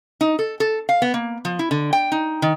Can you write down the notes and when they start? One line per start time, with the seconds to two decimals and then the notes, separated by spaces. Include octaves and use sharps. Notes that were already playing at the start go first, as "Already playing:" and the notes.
0.21 D#4
0.39 A4
0.60 A4
0.89 F5
1.02 B3
1.14 A#3
1.45 F3
1.59 E4
1.71 D3
1.93 G5
2.12 D#4
2.42 D#3